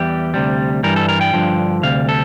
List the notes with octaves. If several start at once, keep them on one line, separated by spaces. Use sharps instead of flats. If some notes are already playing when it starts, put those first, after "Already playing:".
Already playing: E2 E3 G3 G4
D2 C3 G3
G2 E3 G3 A#4
A4
A#4
G5
G2 D3 F3
D2 C3 G3 F5
A4